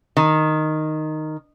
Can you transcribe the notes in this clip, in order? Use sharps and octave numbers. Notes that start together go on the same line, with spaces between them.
D#3